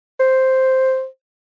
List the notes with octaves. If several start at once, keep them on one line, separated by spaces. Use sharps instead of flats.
C5